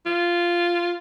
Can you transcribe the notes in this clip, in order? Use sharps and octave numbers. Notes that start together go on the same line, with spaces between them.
F4